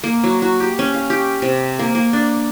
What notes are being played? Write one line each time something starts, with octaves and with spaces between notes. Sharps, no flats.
A#3
F#3
F#4
G4
C#4
F5
G4
C3
A#3
A#3
D4